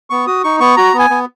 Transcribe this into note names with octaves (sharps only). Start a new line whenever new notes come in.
B3 C#6
F#4 D#6
D#4 C#6
B3 C#6
F#4 A#5
B3
G#5
B3